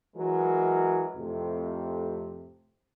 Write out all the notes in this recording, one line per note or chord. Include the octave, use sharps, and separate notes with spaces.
E3 F#3 G#3 A#4
F2 A2 C3